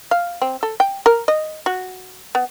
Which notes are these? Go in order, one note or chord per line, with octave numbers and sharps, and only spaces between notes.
F5
C4
A4
G5
A#4
D#5
F#4
B3